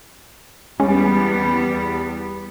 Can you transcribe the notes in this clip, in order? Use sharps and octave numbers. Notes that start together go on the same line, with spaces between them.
E2 G3 G#3 B3 C#4